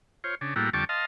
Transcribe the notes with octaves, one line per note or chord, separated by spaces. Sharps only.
F4 C5 C#5
C#3 D4
A2 G3 A#3 E4 F#4
F2 D3 G3 A5 C#6 D6
D#5 F5 A5 C6